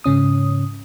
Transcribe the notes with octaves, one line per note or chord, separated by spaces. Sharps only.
G#2 C#3 C#4 D#6